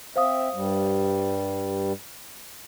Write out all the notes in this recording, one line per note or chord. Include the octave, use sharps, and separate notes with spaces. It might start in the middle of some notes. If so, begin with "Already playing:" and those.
C4 C5 E5 F5 D#6
G2 G3